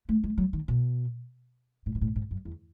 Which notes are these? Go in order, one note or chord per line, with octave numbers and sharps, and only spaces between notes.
A3
G#3
F#3
D#3
B2
A2
B2
A2
G#2
F#2
E2